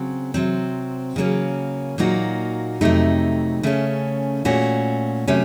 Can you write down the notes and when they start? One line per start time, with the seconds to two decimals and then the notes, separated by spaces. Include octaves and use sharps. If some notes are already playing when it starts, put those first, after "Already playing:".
Already playing: C#3 F#3 C4
0.34 C3 F#3 C4
1.16 C#3 F#3 A#3 C#4
1.98 A#2 F#3 A#3 D#4 F#4
2.81 F2 C3 F#3 A3 D#4
3.63 C#3 A3 C#4
4.45 A#2 A3 C#4 F#4
5.27 C3 F#3 A3 C#4